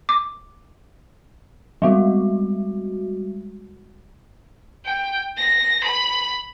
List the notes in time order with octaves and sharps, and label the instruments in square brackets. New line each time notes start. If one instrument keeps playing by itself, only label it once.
[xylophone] D6
[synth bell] G3 G#3 F#4
[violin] G5
A#6
B5